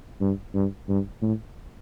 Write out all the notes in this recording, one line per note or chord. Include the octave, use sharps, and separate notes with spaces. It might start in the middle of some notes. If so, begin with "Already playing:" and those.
G2
G2
G2
A2